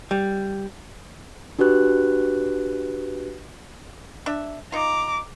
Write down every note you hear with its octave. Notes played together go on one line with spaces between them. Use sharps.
G3
D4 F#4 G4 B4 F#6
D4 E5
D#4 F4 A#5 D6